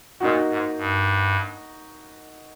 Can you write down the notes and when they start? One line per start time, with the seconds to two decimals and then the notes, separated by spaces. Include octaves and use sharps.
0.20 A#2 A#3 D#4 F#4
0.49 G#2
0.78 G2